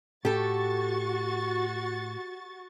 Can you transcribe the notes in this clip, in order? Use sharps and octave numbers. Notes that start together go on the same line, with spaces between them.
A2 F#4 G4 A4 C#6 A6